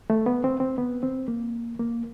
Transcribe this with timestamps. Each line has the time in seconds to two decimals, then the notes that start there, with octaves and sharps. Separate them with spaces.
0.10 A3
0.26 B3
0.44 C4
0.60 C4
0.78 B3
1.03 C4
1.28 A#3
1.79 A#3